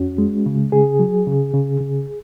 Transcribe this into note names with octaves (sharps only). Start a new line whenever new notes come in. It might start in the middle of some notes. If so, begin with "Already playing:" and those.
Already playing: F2 C#4 F#4
G#3
C#3
C#3 G#4
F#3
C#3
C#3
C#3